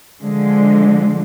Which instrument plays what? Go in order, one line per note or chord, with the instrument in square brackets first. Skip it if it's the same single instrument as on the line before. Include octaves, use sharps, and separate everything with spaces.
[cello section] D3 F3 G#3